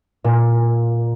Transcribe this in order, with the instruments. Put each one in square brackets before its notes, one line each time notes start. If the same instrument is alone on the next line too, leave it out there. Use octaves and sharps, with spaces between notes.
[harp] A#2